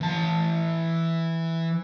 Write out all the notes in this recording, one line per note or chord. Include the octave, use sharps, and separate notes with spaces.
E3 A5